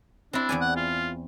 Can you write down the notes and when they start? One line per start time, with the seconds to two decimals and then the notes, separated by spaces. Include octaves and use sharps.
0.33 C4 D4 E4
0.49 E2 D5 G#5
0.61 F#5
0.76 F4